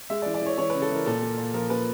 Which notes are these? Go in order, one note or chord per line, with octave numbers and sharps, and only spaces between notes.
G#3 E5
D5
E3
D5
E3 C#5
E3 C#5
C#3 B4
A4
E3 A#4
A#2 A4
A#3
A#2
F3 A#4
A#3 B4